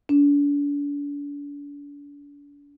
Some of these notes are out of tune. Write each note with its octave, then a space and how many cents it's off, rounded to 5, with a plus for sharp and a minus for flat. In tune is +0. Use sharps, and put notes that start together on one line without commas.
D4 -40